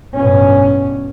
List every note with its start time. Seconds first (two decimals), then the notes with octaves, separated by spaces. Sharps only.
0.16 A1 G2 B2 C#4